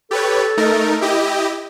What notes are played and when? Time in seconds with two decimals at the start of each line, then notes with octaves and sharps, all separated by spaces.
0.11 G4 A4 B4 C#5
0.57 A3 D#4 A#4
1.01 E4 G4 D#5